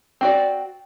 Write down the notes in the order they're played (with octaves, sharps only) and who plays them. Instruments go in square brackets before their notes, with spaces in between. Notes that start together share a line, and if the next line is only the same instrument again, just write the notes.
[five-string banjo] C4 F#4 D5